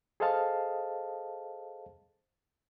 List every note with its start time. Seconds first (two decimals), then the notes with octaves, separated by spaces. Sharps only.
0.20 G#4 A4 C5 D#5 F5 A5